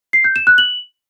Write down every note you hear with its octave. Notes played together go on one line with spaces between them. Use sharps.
C7
G6
E7
F#6
F#7